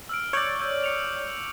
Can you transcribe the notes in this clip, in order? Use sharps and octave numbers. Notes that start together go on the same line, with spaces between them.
E6 F6 D7
C#5 D5 G6 D7 F#7
C#6 E6 G6
D6 C#7 F7